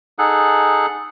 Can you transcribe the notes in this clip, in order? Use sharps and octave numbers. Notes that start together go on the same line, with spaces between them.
D#4 G#4 A4 F#5 F#6